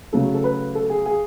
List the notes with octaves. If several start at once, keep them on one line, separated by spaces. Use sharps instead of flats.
C#3 F#3 A3 A4
A4
B4
A4
G#4
G#4